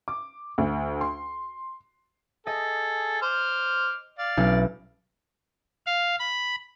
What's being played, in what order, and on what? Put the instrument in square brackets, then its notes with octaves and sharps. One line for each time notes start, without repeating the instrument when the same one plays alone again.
[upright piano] D6
D2
C6
[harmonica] G#4 A4 [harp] D#5
[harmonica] C5 D6 F6
D5 F5
[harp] B1 C#4 E4
[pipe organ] F5
B5